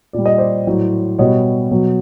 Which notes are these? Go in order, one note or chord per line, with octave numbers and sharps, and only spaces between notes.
A#2 G3 D5
D#5
C5 D5
A2 F#3
B2 G3 C#5 D#5
B2 F#3